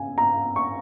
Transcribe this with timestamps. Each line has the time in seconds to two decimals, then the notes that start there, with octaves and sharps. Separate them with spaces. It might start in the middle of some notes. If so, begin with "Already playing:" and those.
Already playing: C#3 G#5
0.18 A#5
0.56 C#6